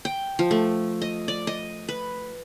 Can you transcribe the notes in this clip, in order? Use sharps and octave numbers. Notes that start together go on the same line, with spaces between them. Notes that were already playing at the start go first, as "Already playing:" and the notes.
G5
F3
A3
D#5
D5
D#5
B4